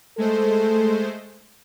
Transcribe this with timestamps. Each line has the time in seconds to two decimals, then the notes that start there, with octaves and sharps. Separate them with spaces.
0.18 G#3 A3 A4 C5